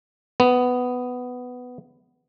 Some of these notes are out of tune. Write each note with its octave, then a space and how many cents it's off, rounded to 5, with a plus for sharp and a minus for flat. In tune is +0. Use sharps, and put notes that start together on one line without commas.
B3 +10